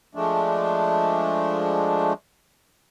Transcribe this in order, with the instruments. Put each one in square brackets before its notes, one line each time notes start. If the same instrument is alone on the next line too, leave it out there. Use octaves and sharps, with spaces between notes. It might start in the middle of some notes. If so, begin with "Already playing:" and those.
[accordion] F3 G#3 A3 D4